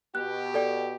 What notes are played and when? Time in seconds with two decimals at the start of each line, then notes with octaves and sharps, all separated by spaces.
0.15 B2 G4 F#6
0.54 A4 D5 G5